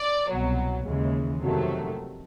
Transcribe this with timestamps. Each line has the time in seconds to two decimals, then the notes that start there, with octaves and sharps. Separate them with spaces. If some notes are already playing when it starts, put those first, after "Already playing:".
Already playing: D5
0.28 C2 B2 F#3
0.85 D#2 C#3 E3 G#3
1.42 F2 C3 D#3 F#3 A3